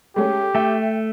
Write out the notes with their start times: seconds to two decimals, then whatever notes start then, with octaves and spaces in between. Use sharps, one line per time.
0.16 G#3 A3 C#4 G4
0.55 A3 E5 G5